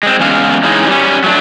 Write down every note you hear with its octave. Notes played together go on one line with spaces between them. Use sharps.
G#3 C4
E2 G#3 C#4 F5
E3 G#3 C#4 D#4
G3 C#4
F#3 A3 D4